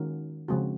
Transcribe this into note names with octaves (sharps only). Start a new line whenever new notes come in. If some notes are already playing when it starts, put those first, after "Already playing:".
Already playing: D#3 G#3 C#4 F#4 A#4
C#3 F3 G#3 C4 F#4